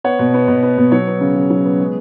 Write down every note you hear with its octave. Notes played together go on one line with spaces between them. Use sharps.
B3 C#5 F#5
B2
B3
B2
B3
B2
F#3 C#5
B3
C#3
C#3
F#3
B3
G#3